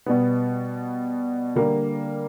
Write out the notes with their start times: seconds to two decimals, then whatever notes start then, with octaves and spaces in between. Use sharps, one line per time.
0.06 B2 G3 B3
1.55 D3 G3 A#3